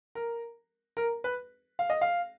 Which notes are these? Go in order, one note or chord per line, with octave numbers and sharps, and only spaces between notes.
A#4
A#4
B4
F5
D#5
F5